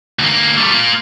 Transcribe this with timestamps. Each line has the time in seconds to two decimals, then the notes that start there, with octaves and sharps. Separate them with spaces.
0.19 D2 A#3
0.57 G3 A3
0.70 A#3 F4